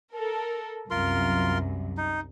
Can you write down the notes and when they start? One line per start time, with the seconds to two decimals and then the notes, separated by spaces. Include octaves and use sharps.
0.14 A4 A#4
0.91 C2 F#2 F4 A#4 C6
1.97 D#4